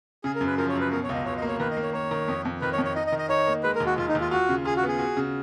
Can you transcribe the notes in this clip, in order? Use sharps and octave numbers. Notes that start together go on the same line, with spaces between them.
C#3 G#4
A#4
F#2
B4
F3 A#4
C#5
F#2 B4
B2 A#4
C#5
C#2 D#5
C#2 C#5
D#5
A#3
C#5
D#3 B4
D#5
A#3
C#5
A#3 C#5
D#3
F2
F2
D#3 B4
C#5
F2
C#5
D#4 D#5
D#5
D#3
D#5
D#4 C#5
A#3
G#3 B4
A#4
D#2
F#4
D#2 F4
D#4
D#2
F4
F4 F#4
C#3
F4 G#4
F#4
B3 G#4
F#4
C#3